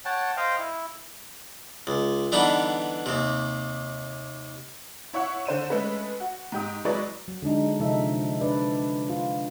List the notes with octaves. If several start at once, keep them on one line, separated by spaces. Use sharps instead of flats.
C#5 F#5 G5 A5
C5 D#5 F5 G5
E4
C#2
D3 E3 G3 B3 D4 D#4
D#2 C3
E4 C#5 E5 F#5 C#6
D3 C5 D#7 E7
G#3 A3 C#4 B4
F#4
G#2 G4 D#6
F#3 G#3 E4 B4 C#5 D5
F#3
D3 G#3 D4 D#4
C3 F3 D#4 A4 E5
D4 B4 D5
F4